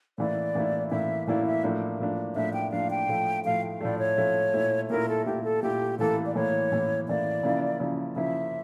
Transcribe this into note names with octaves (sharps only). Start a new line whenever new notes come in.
A2 E3 A#3 E4 D5
A2 E3 A#3 E4
A2 E3 A#3 E4 E5
A2 E3 A#3 E4 D5
E5
A2 F3 A#3 D4
A2 F3 A#3 D4
A2 F3 A#3 D4 E5
G5
A2 F3 A#3 D4 F5
G5
A2 F3 A3
A2 F3 A3 F5
A2 F3 A3 D5
C#5
A2 F3 A3
A#2 A3 E4
A#2 A3 E4 A#4
A4
A#2 A3 E4 G4
A4
A#2 A3 E4 G4
A2 E3 A#3 A4
D5
A2 E3 A#3 C#5
A2 E3 A#3
A2 E3 A#3 D5
C#3 F3 A#3 E4
C#3 F3 A#3 E4
C#3 F3 A#3 E4 E5